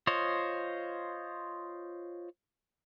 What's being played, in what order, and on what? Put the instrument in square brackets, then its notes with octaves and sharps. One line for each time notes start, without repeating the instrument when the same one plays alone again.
[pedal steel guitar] F4 C5 C#5 D#5